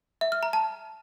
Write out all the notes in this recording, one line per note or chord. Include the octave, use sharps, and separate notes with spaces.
E5
F6
A#5
A5